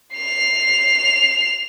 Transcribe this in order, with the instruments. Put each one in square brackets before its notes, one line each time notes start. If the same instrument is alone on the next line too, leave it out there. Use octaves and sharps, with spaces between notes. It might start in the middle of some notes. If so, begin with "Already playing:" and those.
[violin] C7 F7